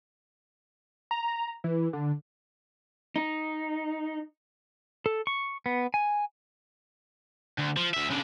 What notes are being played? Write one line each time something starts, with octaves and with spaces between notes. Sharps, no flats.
A#5
E3
D3
D#4
A4
C#6
B3
G#5
D2
F3
D2 E5
C#3 D4